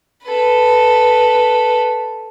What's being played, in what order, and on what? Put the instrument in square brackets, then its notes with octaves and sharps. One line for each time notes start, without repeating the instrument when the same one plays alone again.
[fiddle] A4 B4